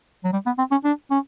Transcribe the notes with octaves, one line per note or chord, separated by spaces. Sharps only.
F#3
G3
B3
C4
C#4
D4
C#4